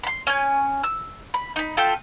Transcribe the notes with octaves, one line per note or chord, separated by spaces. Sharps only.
B5 C6
C#4 G#5
E6
B5
D#4 B5
F4 A4 E5 G5